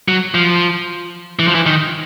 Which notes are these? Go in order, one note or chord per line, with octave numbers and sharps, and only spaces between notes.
F#3
F3
E3
F3
E3
D#3